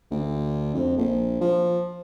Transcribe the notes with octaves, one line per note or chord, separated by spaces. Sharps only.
D2
F2
A#1
F3